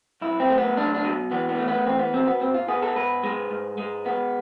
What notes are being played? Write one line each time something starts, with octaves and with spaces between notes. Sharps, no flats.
B1 E4
C4
A3
B3
B1 D4
D4
B2
E2 B3
B3
A3
B3
E2 C4
B3
B2 C4
B3
G#2 C4
F4
B3 G#4
A4
G#2 B4
G#3
G#2
G#3
B3